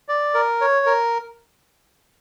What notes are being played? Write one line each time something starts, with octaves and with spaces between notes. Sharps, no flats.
D5
A#4
C#5
A#4